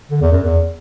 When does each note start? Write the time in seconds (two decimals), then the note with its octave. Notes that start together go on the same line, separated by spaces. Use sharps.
0.11 D3
0.21 E2
0.32 F#2
0.43 E2